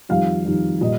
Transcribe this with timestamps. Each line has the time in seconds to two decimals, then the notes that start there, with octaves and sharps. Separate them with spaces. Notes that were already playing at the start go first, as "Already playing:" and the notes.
0.09 F2 D#3 G3 F5
0.45 F2 D#3 G3
0.81 A#2 G3 D#5